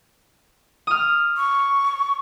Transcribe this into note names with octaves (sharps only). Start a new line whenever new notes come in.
D#6 F6
C#6